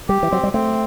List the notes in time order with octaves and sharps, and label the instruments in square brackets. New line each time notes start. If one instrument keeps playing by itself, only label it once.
[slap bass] G3 [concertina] G4
[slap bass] E3
[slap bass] F#3 [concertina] C4
[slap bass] G3
[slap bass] A3 [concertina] C4